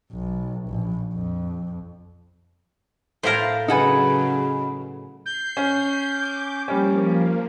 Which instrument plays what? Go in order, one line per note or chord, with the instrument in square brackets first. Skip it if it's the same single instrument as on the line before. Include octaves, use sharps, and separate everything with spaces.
[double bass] B1
A#1
F2
[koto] A2 E4 A#4 [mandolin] C5 F5 A5
[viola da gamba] C#3 F#3 [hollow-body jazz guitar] D#4 G#4 B4 [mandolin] A4 F#5 G#5
[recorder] G6 [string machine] C7
[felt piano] C#4
[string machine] D6
[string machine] F3 A#3 [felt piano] G3 C#4